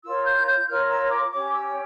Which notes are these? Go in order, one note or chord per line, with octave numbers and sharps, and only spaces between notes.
F4 A#4 C#5 E6
G6
G6
F4 A#4 C#5 F6
E6
D6
C#4 G4 C#5 D6
E6